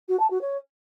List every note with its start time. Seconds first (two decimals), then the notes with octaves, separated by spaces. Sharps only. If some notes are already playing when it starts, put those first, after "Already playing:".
0.08 F#4
0.19 A5
0.30 F#4
0.41 C#5